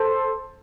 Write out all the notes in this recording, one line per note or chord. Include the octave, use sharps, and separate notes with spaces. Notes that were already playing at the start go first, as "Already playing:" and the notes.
Already playing: A4 C5